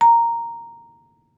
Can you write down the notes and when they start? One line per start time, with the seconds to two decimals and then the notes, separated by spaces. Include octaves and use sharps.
0.01 A#5